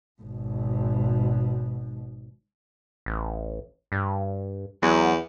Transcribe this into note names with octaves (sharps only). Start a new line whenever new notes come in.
G#1 B2
A1
G2
E2 F#3